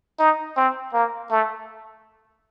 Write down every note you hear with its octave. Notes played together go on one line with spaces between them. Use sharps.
D#4
C4
A#3
A3